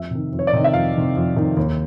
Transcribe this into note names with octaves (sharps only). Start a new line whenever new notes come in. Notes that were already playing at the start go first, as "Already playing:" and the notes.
Already playing: F2 E5
C3 D#3
F2
C#5
D5
C3 D#3 D#5
E5
F2 F5
C3 D#3
F2
C3 D#3
D#2